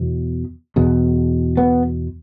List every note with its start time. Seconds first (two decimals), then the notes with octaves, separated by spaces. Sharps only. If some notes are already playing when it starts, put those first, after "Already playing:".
Already playing: E2 B2
0.76 E2 B2
1.57 B3